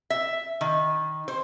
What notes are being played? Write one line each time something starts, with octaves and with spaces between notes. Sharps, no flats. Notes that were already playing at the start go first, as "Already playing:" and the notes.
E5
D#3
C5